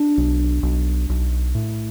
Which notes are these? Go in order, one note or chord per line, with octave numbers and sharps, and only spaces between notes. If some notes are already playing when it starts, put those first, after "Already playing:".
Already playing: D4
B1
B1
B1
A2